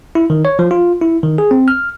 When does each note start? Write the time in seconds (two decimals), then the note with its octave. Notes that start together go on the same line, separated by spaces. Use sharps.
0.15 E4
0.30 D#3
0.45 C#5
0.59 F3
0.71 F4
1.01 E4
1.23 D#3
1.38 G#4
1.51 C4
1.68 F6